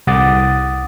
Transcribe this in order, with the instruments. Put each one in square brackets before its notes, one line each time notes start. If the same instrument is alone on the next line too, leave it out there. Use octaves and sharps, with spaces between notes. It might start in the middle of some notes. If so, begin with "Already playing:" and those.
[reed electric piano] C2 F#5 D6 D#6 A6